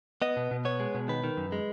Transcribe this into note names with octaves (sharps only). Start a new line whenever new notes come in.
B3 D#5
B2
B2
B3 C#5
G#3
B2
D#3 B4
D#3
F#2
G#3